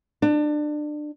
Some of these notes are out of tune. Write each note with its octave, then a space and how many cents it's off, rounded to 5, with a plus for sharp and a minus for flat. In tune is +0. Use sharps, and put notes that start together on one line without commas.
D4 +25